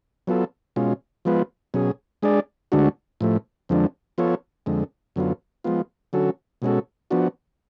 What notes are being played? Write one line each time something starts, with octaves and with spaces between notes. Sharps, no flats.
F#3 B3 F4 A4
B2 G#3 C#4 F4
F3 G#3 B3 F4 B4
B2 F#3 C#4 G#4
G#3 D4 G#4 D5
D2 D3 G#3 D4 F#4
A2 F3 A3
F2 D3 F3 G#3 D4
F3 B3 F4 A4 C#5
F2 D3 G#3
F#2 D3 F#3 B3 F4
F3 G#3 B3 F4
D3 F#3 C#4 F#4 A4
B2 G#3 C#4 F#4 A4
F3 B3 D4 F#4